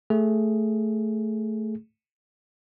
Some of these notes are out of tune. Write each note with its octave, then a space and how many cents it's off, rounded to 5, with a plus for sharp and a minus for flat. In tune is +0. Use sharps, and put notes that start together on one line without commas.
A3 +0 G#4 +0